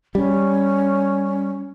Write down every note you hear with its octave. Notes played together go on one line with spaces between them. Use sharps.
G3 C#4